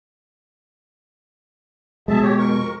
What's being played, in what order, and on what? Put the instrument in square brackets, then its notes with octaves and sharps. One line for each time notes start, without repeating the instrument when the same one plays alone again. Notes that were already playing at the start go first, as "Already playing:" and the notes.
[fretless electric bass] B2 G#3 [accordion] G#4 E5 A5
[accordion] G4 C#5
F2 A#4 C#6